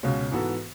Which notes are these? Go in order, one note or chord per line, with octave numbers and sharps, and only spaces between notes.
C#2 B2 G#3 C#4 F#4
G#2 E3 B3 F#4 A4